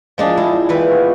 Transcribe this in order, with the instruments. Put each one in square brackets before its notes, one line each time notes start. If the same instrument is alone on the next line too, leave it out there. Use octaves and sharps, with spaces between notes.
[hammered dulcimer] A#2 G4 [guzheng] F3 G#3 D4
[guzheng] G#3 [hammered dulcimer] E4
[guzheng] E3 B4 [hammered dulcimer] C5 E5 G5
[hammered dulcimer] B3 F4 C#5